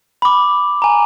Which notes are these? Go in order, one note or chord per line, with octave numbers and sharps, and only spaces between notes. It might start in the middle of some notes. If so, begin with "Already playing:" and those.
B5 D6
G#5 A#5